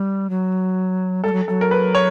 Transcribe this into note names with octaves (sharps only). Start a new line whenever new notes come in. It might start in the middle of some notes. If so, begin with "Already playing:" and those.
Already playing: G3
F#3
G3 A4
F#3
F#3 A4
A#4
B4
C#5